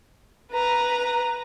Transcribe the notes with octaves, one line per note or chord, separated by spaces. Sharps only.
B4 A#5